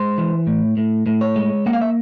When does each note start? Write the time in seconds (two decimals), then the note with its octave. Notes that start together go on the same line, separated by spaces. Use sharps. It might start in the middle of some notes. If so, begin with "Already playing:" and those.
Already playing: G#3 C5
0.18 E3
0.47 A2
0.77 A2
1.06 A2
1.21 C#5
1.36 G#3
1.66 A#3 F#5
1.73 F5
1.81 E5